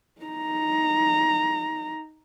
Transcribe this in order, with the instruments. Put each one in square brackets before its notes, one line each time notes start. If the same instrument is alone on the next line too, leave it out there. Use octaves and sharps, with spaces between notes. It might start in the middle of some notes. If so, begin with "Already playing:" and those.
[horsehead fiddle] D#4 A#5